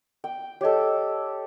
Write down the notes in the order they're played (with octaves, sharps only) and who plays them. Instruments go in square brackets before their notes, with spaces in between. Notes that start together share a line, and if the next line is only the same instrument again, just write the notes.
[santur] G5
[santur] G4 A4 [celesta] C#5 D#5